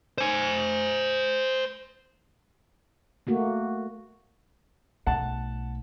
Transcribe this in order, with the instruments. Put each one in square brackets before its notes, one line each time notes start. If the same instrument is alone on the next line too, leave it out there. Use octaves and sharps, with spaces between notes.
[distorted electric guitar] C5 G#5
[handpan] A3 A#3 F#4
[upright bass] B1 A3 [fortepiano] F#5 A5